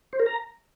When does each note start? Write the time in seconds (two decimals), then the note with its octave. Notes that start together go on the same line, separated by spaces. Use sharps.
0.13 C5
0.20 A#4
0.26 A#5